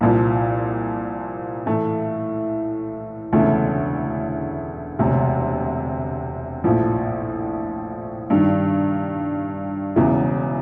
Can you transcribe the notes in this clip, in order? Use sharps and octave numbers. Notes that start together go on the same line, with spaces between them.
C2 A#2 F3
A2 E3 A3
E1 D2 C#3 E3 A3
E1 D2 C3
A#1 A2 F3
G2 D#3 G3
E1 E2 C#3 E3